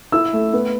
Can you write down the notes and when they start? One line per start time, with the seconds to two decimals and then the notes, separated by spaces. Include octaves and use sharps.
0.12 E4 E6
0.33 A3
0.53 B3